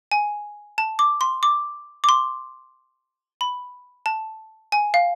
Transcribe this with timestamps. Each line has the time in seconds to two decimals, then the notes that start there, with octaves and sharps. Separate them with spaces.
0.12 G#5
0.78 A5
0.99 D6
1.21 C6
1.43 D6
2.04 D6
2.09 C6
3.41 B5
4.06 A5
4.72 G#5
4.94 F5